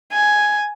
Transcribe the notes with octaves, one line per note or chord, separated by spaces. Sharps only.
G#5